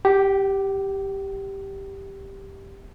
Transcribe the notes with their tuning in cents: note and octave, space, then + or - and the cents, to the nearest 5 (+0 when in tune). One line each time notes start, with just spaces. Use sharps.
G4 +0 G5 -45